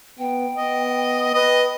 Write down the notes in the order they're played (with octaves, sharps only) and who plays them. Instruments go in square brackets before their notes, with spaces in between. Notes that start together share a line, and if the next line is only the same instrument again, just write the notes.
[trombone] B3 [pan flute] G5
[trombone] B3 [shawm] D#5
[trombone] B4 [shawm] D#5